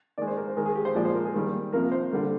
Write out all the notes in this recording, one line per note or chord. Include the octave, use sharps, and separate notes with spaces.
D#3 G#3 D5
C5
A#4
C5
D#3 G#3 A#4
G#4
G4
C5
A#2 F3 G#3 D5
C5
A#4
G#4
D#3 G3 A#3
C3 F3 A#3 A#4
C5
D3 G3 A#3